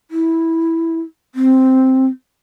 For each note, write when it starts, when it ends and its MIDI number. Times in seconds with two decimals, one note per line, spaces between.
0.11 1.00 64
1.35 2.06 60